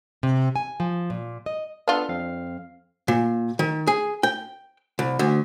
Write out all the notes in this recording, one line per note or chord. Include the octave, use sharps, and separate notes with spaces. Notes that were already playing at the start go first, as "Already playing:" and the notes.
C3
G#5
F3
A#2
D#5
B3 D4 F4 A4
F2 C4 F5
A#2
D#3
G#4
G5
C2
D2